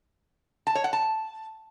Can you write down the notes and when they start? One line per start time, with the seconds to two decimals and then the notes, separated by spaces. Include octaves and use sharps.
0.67 A5
0.75 C#5
0.84 F#5
0.93 A5